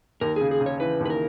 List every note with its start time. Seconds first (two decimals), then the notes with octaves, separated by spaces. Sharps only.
0.21 D#2 A#4
0.36 C#3 G#4
0.51 G#4
0.61 C#3
0.66 C#5
0.80 E3 B4
1.00 D#2
1.05 B4
1.10 A#4